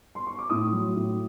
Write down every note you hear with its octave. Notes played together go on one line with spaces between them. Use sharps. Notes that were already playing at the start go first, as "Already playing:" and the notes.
C6
C#6
D6
A2 D#6
F#3
A2